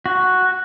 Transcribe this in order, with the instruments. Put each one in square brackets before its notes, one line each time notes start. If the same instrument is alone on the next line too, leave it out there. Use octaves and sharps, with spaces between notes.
[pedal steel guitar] F#4